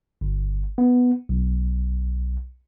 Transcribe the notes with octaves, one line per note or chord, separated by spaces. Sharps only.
G1
B3
B1